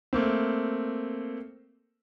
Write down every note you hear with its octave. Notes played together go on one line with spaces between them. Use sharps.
A3 A#3 C4